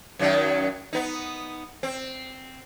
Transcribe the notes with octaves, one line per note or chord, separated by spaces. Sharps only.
F#2 D#3 F#3
B3 D#4
C4